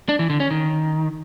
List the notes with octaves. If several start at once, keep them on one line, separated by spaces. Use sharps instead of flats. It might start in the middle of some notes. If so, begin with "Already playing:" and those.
D4
E3
D3
C#4
D#3